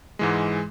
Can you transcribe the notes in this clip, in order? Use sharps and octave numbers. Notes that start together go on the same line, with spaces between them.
G#2 E3 G#3